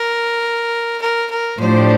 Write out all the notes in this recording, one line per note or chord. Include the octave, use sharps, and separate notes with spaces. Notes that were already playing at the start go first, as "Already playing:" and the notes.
Already playing: A#4
A#4
A#4
A2 F3 A3 D4 G4 C5